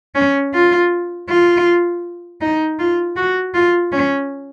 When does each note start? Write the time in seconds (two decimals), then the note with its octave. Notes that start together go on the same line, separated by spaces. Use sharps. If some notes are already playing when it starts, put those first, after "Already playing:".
0.15 C#4
0.53 F4
1.29 F4
2.41 D#4
2.79 F4
3.16 F#4
3.54 F4
3.92 C#4